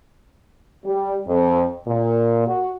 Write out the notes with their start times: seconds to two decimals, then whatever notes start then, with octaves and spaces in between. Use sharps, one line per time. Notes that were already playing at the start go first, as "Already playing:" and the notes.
0.85 G3
1.27 F2
1.86 A#2
2.47 F#4